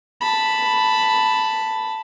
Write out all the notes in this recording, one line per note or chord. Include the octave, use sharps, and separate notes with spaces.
A5 B5